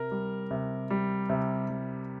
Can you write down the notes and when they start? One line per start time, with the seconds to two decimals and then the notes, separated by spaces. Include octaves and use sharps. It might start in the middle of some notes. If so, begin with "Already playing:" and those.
Already playing: C3 A#4
0.11 G3
0.51 C3
0.90 G3
1.30 C3
1.69 G3